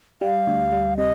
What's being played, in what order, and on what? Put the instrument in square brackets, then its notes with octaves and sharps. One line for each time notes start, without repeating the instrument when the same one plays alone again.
[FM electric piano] G3 [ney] F5
[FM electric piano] D2
G3
[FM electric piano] C3 [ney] D#5